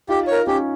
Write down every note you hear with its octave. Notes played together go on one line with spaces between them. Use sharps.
D#4 F4 G4
A#4 C#5
C#4 D#4 G4